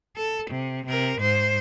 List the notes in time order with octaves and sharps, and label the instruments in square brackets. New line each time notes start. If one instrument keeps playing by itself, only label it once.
[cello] A4
C3
C3 A#4
G#2 C5